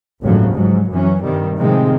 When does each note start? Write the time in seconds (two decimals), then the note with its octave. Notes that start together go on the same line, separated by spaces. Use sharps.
0.21 G1 D#2 A2 C#3 F3 F#3
0.52 G#2 F#3
0.89 F#2 E3 F#3 C#4
1.21 G2 C3 D#3 G3
1.57 A2 C3 D#3 F3 G#3 C4